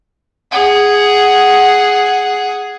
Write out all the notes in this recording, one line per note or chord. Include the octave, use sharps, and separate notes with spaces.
G#4 F#5